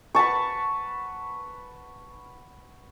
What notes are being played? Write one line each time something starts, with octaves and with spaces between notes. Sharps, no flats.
B4 F#5 A5 C#6